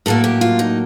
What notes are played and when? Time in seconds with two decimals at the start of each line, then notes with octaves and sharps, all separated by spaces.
0.06 A2 F#3 A#3 A4
0.24 G4
0.41 F4
0.59 D#4